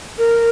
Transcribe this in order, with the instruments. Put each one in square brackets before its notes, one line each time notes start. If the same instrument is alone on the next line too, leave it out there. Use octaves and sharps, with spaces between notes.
[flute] A#4